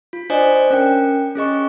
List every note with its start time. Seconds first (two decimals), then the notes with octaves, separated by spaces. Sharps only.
0.13 F4
0.30 D4 C5 D5 D#5 G#5
0.70 C#4 A#4 G5
1.36 C#4 G#4 D#5 C#6